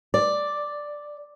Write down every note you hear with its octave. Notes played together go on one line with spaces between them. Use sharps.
D5